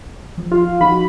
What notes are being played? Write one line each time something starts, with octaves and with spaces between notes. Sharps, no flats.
F3
F4
F3 D#4 F#4 B5